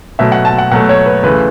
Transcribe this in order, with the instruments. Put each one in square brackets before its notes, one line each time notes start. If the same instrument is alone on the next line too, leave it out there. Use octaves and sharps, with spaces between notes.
[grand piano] B2 F#3 A3 E5
F#5
A5
F#5
B2 F#3 A3 F#5
C#5
B4
C#2 C#3 E3 A3 B4